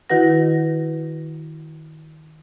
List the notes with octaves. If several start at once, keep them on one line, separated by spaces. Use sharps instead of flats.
D#3 E4 F#4 B4 F#5 A#6